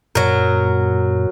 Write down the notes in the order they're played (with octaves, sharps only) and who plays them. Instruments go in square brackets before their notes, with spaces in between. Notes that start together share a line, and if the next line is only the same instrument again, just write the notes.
[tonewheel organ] F#2 A#2 [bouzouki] F#3 A#4